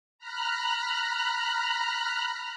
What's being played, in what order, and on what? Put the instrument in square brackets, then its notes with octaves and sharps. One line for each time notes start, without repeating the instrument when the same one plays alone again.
[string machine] A#5 B5 F6 F#6